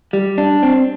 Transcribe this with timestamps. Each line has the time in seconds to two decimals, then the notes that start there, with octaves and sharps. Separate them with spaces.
0.13 G3
0.38 D4
0.63 C4